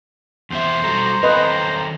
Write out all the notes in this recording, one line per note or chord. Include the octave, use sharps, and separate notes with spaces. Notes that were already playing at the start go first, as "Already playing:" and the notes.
E2 C4 C5 E5
G3 F#4 A4 A#5
D#3 C4 A4 B4 D#5